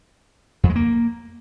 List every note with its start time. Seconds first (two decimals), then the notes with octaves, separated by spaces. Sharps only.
0.63 F2
0.70 G#3
0.76 A#3